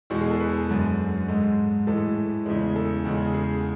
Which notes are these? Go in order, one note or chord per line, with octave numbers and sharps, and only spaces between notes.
E2 B2 G#3 F#4
G#4
A4
B4
F#2 D3 G#3
G#2 G#3 A4
A2 E3 G#3 A4
E2 C#3 E3 G#3
A4
E2 C#3 G#3
G#4